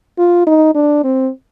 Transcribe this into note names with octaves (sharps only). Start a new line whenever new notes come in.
F4
D#4
D4
C4